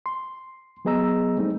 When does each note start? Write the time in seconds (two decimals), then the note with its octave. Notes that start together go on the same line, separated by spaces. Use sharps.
0.06 C6
0.85 F#3 B3 G#4 D#5 A#5 E6
1.38 G3 A3 C4 D#4